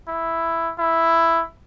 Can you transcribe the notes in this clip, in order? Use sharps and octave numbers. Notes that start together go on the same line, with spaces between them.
E4
E4